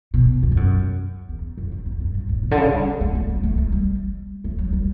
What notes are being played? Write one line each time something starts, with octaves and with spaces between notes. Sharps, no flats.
B2
E2
G2
F#2
E2
F#2
F#2
E2
F#2
G2
A2
B2
D3
C#3
G3
A3
A3
G3
A3
A3
G3
A3
F#3
G3